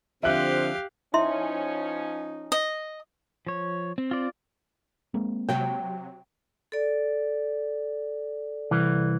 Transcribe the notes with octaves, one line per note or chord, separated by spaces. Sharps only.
D3 F3 C4 G4 E5 F5 F#6
F3 C#4 D#4 E4 E5 C6
D#5
F3 C#5
C4
F4 D5
G#3 A#3 C4
C3 F#3 G5
A4 D5
C2 E3